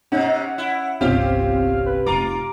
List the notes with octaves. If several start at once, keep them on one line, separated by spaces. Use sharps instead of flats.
C3 C#4 D#4 F#5
E4
G1 C2 C4 C#4 F4 G4 F5
B4
F1 D#4 F4 A#5 D6